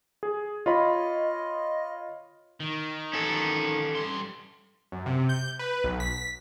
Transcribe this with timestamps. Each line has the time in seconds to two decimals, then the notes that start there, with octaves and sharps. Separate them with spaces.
0.23 G#4
0.66 F4 C#5 D#5 B5
2.60 D#3
3.13 C#4 A4
3.95 G2 C6
4.92 F#2
5.06 C3
5.29 G6
5.59 B4
5.84 B1
6.00 B6